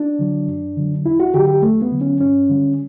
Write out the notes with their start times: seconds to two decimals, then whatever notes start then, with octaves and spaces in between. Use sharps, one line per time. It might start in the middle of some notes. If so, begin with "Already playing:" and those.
Already playing: D4
0.19 D3 F#3
0.47 F#2
0.77 D3 F#3
1.05 E2 E4
1.20 F#4
1.34 D3 F#3 G4
1.48 G4
1.62 E2 A3
1.82 B3
1.92 D3 F#3
2.01 C#4
2.20 G2 C#4
2.49 D3 G3